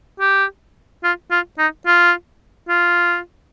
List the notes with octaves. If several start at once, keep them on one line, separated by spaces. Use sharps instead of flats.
G4
F4
F4
D#4
F4
F4